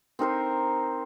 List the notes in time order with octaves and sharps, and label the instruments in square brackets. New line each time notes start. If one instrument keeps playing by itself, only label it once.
[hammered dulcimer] C4 D#4 A#4 C5